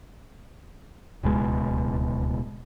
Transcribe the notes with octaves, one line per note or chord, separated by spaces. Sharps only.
D1 C#2 B2 G#3